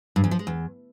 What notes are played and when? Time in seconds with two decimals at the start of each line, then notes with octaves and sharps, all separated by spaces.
0.16 G2
0.24 E2
0.31 F3
0.39 G#3
0.47 E2